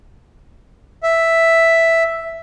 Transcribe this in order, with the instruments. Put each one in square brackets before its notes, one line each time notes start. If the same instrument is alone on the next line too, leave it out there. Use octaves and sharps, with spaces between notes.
[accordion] E5